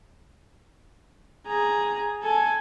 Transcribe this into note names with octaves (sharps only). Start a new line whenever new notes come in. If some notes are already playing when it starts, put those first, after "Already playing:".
G#4 A#5
A4 G#5